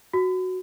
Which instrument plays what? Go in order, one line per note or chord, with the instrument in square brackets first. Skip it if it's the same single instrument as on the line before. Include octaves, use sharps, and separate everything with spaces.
[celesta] F#4